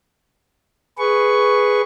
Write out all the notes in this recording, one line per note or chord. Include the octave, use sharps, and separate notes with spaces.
G#4 B4 C#6